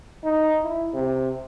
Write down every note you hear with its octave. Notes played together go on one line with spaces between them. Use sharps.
D#4
E4
C3